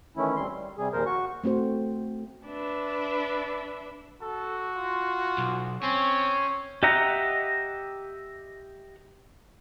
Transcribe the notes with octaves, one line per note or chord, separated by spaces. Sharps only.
D#3 E3 A3 C#4 E4
D2 G3 C4 C6
G3
C3 G3 G#4
D#2 A#2 F3 A#4 C5
F#4 C#6
A3 C4 F#4 C5
D4 B4 E5
F#4 A4
F4
B1
C4 C#4 C#5
G4 D#5 E5 F#5 A#5